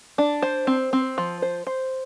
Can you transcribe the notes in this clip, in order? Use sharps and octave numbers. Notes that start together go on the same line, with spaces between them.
D4
C5
C4
C4
F3
C5
C5